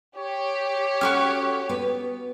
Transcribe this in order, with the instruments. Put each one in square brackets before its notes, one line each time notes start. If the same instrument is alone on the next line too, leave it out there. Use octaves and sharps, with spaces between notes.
[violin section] G4 [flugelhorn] C#5
[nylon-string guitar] C#4 A4 [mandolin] F#4 C#6 F6
[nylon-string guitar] B3 B4